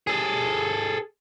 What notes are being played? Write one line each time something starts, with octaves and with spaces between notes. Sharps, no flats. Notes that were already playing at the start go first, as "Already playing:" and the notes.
G#4 A4